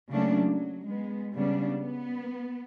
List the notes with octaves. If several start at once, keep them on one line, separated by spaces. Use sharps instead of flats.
C#3 F#3 A3 A#3 C#4 D4
F#3
G#3 B3
C#3 G3 B3 D4
B3